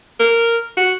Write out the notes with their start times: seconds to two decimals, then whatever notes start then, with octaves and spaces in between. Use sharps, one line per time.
0.20 A#4
0.77 F#4